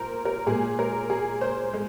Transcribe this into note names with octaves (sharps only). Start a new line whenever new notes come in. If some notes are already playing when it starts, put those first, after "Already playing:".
Already playing: A#2 A#4 C5
A#4
A#2 G#3 G#4
A#4
G#4
C5
G#3